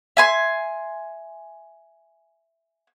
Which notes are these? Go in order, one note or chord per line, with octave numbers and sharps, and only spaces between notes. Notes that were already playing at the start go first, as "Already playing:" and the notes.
E5 G#5 C6